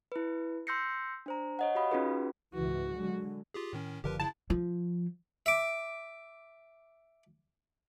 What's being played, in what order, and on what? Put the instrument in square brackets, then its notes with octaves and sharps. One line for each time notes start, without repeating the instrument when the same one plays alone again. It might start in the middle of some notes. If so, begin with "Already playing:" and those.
[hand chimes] E4 B4
C6 E6 G6 A#6 C7 C#7
D4 C5 A#5
C#5 D#5 F#5
F#4 G4 F5 B5 D#6
C#4 D#4 F4 F#4 G#4 B4
[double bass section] C#2 G#2 E3 [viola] F#4
[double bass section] D3 F#3 G#3
[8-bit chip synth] F4 G4 G#4
A2 D#3 C#4
[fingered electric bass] F#1 D3 F3 [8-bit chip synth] G4 A#4 B4
[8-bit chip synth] C#3 E4 [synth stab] A5
[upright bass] F3
[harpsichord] E5 D6